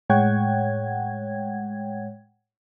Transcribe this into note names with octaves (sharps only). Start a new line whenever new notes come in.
A2 G#3 C#5 F#5 G5 G#6